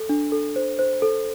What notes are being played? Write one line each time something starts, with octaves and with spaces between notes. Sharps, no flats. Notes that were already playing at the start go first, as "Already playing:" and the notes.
Already playing: A4
D4
A4
C5
C5
A4